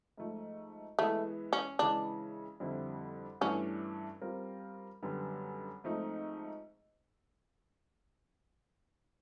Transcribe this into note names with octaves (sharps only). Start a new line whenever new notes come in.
G#2 F3 A3
E3 G#3 A3 B3
C#4
C#3 E3 G#3 D4
F2 D3 G3 C4 E4
G2 E3 A3 C#4 D4
G3 C4 F4 A#4
F#2 D3 G3 B3
G#2 F3 A3 C4 D#4